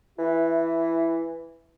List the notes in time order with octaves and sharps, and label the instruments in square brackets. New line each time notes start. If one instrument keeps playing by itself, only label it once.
[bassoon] E3 [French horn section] E4